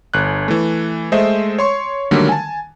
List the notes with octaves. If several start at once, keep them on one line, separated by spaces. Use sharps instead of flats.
G1 F#6
E3 A3
G#3 A3 C5 D#5 E5
C#5 C6 C#6
D3 D#3 F#3 G3 A3 A#3
G#5 A5